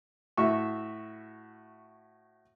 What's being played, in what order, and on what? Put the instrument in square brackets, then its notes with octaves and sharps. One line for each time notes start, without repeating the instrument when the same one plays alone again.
[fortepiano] A2 F#4 E5 C#6